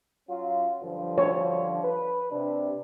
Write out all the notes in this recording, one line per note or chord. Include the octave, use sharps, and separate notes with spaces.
F#3 C#4 F4
G2 D3 F3
C#5
B4
C3 D4